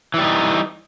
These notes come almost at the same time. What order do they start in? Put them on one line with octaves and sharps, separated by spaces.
E3 G3 D#4